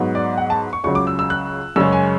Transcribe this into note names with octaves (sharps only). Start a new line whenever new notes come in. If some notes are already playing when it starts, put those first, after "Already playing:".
Already playing: G#2 F#3 B3
D5
F#5
A5
C#6
C#2 C#3 F#3 C#6
D6
E6
E6
F#6
F#2 C#3 G#3 C#4 E6
G#5